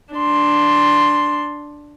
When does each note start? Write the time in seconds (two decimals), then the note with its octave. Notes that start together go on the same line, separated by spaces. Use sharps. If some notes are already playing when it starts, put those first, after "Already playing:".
0.14 D4 C6